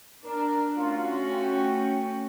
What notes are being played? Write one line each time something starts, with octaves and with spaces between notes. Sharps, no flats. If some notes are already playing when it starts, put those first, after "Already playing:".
D4 A#4
A3 C#4 F4 F#4
G5